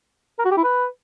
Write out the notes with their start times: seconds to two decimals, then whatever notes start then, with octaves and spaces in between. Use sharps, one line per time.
0.39 A#4
0.45 F#4
0.51 G4
0.57 E4
0.64 B4